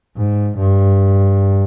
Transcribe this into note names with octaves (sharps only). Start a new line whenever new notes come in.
G#2
G2